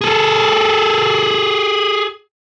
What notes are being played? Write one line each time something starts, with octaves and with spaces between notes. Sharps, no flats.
G#4 A4